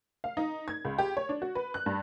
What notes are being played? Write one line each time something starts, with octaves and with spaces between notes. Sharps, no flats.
F5
D#4
G#6
C#2
G4
C#5
D4
F#4
B4
F#6
G2